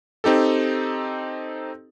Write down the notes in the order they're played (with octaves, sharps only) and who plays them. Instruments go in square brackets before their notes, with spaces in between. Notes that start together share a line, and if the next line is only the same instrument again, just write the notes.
[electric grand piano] C4 D#4 G4 A4